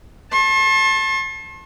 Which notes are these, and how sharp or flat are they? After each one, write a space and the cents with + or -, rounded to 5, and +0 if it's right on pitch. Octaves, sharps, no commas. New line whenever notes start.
A5 +0 C6 +45